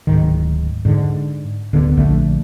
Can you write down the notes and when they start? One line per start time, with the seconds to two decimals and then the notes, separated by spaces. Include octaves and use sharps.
0.07 D1 G#2 D#3
0.85 G#2 D3
1.73 D1 D3 B3
1.97 A#1 D3 A3